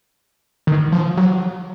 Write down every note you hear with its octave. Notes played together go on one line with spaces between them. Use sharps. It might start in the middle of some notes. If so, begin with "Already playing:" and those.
D#3
F3
F#3